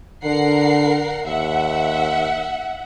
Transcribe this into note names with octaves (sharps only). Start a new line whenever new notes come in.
D3 A#4 F#5 C7
D#2 E5 F#5